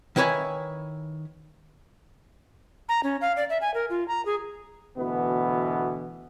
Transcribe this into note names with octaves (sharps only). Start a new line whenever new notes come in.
D#3 E4 B4 C#5 G#5
A#5
C#4
F5
D5
E5
G#5
A#4
F4
A#5
G#4
D2 B2 E3 B3